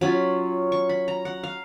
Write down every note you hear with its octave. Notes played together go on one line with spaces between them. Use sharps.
F#3 C#4 F4 B5
C#6
B5
A#5
F#5
F5